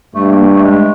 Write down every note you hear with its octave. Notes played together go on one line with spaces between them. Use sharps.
G2 A3
A#3
A3
G#3